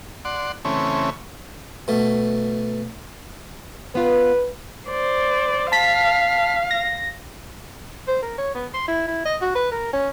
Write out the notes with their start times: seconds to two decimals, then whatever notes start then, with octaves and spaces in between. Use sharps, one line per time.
0.25 D5 F#5 C6
0.65 C#3 E3 A3 C4 C#4
1.88 B2 A3
3.95 B3 F4 B4
4.88 C5 D5
5.72 F5 A5 B6
6.71 A#6
8.08 C5
8.22 A#4
8.38 C#5
8.55 B3
8.74 C6
8.88 E4
9.08 E4
9.25 D#5
9.41 F#4
9.55 B4
9.72 A#4
9.93 C#4